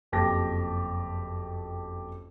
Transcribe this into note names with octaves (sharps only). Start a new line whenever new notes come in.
F#1 F2 G4 A5 A#6